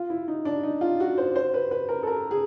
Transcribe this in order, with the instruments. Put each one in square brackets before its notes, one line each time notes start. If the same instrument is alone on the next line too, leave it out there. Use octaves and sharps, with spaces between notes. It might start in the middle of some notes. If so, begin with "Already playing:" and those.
Already playing: [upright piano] F4
E4
D#4
D4
D#4
F4
F#4
C5
C5
B4
B4
A#4
A4
A#4
G#4